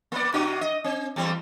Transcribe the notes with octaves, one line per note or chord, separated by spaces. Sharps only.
A#3 D5
C3 D4 F#4
D#5
C4
E2 G3 C4